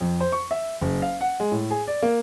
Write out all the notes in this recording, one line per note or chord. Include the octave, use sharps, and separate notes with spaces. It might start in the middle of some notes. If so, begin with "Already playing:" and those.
F2
C5
C#6
E5
F#1
F5
F#5
G#3
A2
G#4
D5
A#3